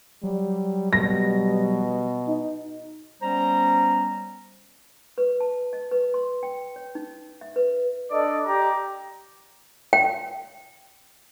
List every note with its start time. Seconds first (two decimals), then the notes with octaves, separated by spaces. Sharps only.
0.23 F#3 G3
0.93 B2 G3 A#6
2.28 D#4
3.21 G3 B3 C#4 C5 A#5
5.18 B4
5.41 A5
5.73 D#5
5.92 B4
6.14 C6
6.43 G5
6.76 C#5
6.95 D#4
7.41 E5
7.56 B4
8.11 D4 A4 D5 D#5
8.46 G4 D5 A#5
9.93 G5